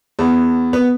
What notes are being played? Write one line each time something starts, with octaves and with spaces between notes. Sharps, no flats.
E2
B3